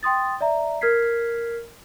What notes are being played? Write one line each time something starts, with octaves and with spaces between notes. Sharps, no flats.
G5 C6 D#6 A6
D5 E5 A#5
A#4 F6 G#6 B6 C7